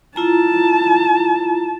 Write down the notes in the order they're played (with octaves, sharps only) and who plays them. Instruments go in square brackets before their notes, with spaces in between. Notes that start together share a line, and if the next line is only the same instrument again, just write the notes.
[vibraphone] E4 F4 A#5 [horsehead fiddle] A5